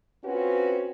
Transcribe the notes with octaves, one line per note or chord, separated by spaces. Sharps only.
C4 C#4 F4 F#4 B4